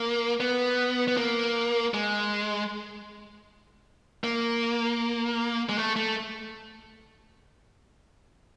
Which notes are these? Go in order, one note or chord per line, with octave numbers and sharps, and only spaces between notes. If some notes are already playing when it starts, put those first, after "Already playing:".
Already playing: A#3
B3
B3
A#3
G#3
A#3
G#3
A3
A3